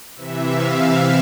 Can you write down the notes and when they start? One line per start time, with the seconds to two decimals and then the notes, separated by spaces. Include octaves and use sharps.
0.16 C3 E3 E5
0.47 F5
0.79 E5